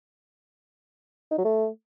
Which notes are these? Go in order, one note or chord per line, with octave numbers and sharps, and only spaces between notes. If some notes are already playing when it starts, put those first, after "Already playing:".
D#4
F#3
A3